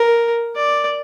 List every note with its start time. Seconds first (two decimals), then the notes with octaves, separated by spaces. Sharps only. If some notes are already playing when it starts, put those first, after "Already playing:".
Already playing: A#4
0.56 D5